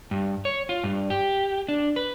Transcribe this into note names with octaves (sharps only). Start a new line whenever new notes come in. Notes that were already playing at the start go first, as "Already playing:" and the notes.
G2
C#5
F4
G2
G4
D4
B4